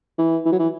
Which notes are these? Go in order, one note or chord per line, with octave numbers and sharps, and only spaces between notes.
E3
E3
F#3
E3